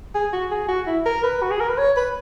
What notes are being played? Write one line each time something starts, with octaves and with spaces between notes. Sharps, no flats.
G#4
F#4
G#4
F#4
E4
A#4
B4
F#4
G#4
A#4
B4
C#5
B4